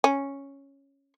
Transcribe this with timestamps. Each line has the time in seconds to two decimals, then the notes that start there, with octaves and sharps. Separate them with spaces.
0.04 C#4